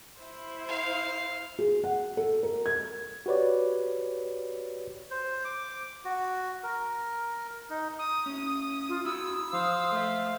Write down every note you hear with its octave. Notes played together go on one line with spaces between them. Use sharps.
E4 C5
F5
G#4
F#5
A4
A#4
G#6
F#4 G4 B4 C#5 D5
C5
D6
F#4
A#4
D#4
D#6
C#4 E4
F4
E4 F#4 D#6 E6
F3 C5 F5
A3 E5